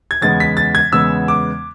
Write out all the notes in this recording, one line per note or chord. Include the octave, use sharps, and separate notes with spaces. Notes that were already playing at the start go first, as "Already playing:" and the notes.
G#6
E2 C#3 G#3 B3 A6
B6
A6
G#6
E2 C#3 G#3 B3 E6
D6